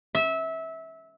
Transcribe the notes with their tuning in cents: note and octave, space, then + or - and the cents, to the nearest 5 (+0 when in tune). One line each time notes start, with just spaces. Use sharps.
E5 -20